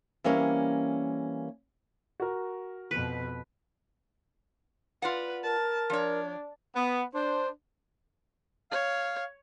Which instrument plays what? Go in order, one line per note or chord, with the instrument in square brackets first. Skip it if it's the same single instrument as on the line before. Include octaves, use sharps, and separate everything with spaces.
[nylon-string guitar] E3 G3 A#3 C4 C#4 A#4
[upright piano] F#4 A#4
[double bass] F2 B2 [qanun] B4
[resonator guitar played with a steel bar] F4 D5 F#5 [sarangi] B4
[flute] A#4 [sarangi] A5
[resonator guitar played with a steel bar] F3 C#5 [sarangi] D4
[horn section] B3
D4 C5
[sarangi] C#5 [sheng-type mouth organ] F5